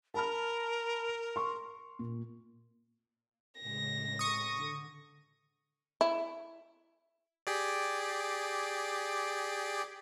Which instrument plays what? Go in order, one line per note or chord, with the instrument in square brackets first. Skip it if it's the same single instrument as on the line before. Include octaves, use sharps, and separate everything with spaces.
[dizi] A#4 [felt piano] A5 B5 F6
[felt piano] C6 C#6
A#2
[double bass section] A2 C#3 G#3 [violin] A#6
[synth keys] C#6 D#6
[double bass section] D3
[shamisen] E4
[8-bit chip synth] G4 G#4 D5